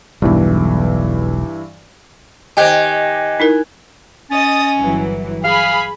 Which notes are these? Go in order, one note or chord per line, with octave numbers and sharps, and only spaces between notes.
E1 B1 G2 E3
D#3 G4 C5 D#5 G#5 F#6 G#6
D#4 E4 A#4
C#4 D#5 D#6 A6
G1 E3 F#3
G#4 F5 B5